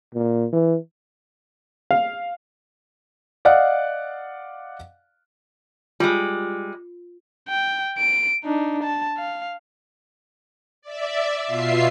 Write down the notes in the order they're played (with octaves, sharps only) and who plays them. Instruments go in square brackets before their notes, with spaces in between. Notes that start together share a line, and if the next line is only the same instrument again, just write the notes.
[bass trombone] A#2
E3
[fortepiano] F5
[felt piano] D5 D#5 F5 F#5
[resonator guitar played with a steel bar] G3 G#3 [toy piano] F4
[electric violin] G5
D7
D4 D#4
A5
F5
[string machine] D5 E5
B2 F4 E5 C7